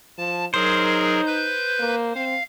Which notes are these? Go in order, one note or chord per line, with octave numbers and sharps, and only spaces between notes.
F3 A5
F#3 D#4 G#4 A#4 C5
B4 G6
A#3
C4 F5